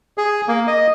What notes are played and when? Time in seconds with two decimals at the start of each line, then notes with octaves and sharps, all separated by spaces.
0.18 G#4
0.48 A#3
0.67 D#5